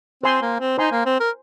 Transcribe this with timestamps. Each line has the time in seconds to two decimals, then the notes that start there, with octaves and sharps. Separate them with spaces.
0.23 C4 C5 G#5 C6
0.42 A#3
0.60 C4
0.78 D#4 C5 G#5 C6
0.92 A#3
1.06 C4
1.20 A#4